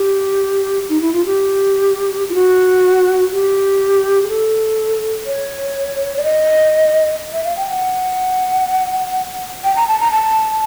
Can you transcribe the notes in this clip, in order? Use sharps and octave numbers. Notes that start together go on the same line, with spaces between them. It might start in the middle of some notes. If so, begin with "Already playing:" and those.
Already playing: G4
D#4
E4
F4
G4
F4
F#4
G4
G#4
A4
C#5
D5
D#5
E5
F5
G5
F#5
G5
A#5
A5
A#5
A5